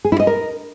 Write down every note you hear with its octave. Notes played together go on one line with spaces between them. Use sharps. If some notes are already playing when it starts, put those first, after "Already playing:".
G#4
E4
D#5
A#4